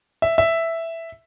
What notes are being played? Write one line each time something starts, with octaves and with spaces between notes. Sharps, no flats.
E5
E5